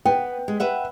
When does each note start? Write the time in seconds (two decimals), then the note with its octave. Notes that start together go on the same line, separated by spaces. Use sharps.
0.05 B3 G5
0.48 G#3
0.60 B4 E5 F#5